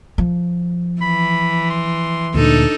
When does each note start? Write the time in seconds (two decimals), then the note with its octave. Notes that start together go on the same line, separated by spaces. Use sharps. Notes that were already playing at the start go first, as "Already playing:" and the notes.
0.18 F3
1.01 E3 B5
1.70 C6
2.35 D2 A#2 D4 D#4 A4